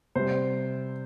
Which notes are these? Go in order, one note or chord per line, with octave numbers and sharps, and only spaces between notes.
C3 G3 C5